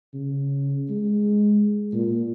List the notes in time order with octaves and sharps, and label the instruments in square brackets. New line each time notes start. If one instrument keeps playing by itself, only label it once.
[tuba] C#3
G#3
A#2